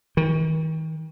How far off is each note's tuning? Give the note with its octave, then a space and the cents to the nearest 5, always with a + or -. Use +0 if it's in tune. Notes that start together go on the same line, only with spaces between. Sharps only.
D#3 +40